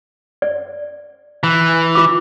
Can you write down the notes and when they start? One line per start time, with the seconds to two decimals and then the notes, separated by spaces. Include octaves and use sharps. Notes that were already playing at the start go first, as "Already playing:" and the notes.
0.42 D5
1.44 E3
1.95 F4 D6